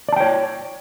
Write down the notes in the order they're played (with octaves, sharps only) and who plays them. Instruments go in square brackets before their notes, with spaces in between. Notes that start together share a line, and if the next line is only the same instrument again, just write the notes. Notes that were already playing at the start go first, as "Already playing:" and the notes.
[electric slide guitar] D5
A5
G5
C#5